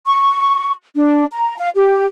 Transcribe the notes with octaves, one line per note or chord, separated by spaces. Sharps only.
C#6
D4
A#5
F5
G4